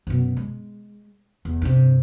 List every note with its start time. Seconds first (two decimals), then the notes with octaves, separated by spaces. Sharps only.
0.07 F#2 B2
0.37 G#3
1.45 E2
1.62 G2 C3